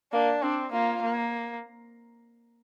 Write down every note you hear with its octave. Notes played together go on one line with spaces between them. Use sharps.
A#3 D4
C4 D4
A#3 F4
A#3